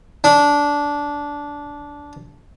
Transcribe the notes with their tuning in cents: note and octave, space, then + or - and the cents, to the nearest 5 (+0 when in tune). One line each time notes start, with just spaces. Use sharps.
D4 -15